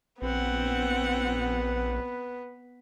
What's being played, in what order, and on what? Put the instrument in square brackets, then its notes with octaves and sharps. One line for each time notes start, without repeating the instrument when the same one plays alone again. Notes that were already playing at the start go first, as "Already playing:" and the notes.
[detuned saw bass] A#1 [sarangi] B3 [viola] C4 F#5 [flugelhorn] B4